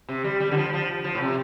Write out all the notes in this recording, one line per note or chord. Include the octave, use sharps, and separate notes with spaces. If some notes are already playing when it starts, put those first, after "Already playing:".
C3
G3
G3
D3
F3
F3
F3
A2
C3